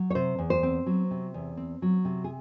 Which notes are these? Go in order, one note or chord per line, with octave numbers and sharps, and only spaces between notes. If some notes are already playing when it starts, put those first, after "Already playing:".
Already playing: F#3
C#5
C3 C5
E2
C5
C4
F#3
C3
E2
C4
F#3
C3
G#4